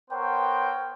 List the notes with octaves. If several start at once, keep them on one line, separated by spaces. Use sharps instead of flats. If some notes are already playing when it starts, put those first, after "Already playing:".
B3 A#4 C5 C#5 G5